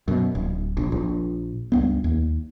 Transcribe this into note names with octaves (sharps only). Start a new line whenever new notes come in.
F#2 B2
D1
A#1
A#1
C#2 G2 B3
D#2